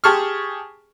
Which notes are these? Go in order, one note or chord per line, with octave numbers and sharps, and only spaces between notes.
G4 G#4 A5 C#6 F6